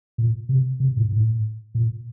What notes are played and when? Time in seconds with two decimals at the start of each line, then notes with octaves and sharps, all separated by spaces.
0.18 A#2
0.49 C3
0.80 C3
0.97 A2
1.12 A2
1.75 A#2